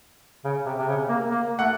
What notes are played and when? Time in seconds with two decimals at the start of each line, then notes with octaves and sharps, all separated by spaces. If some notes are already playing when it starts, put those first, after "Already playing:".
0.45 C#3
0.66 C3
0.78 C3
0.88 C#3
1.09 A#3
1.31 A#3
1.59 A3 F#5